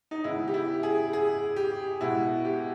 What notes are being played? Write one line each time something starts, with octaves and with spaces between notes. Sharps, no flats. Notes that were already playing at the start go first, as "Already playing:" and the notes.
D#4
C#3 G#3 B3 E4
G4
E4
G#4
G#4
G4
B2 G#3 B3 E4
G4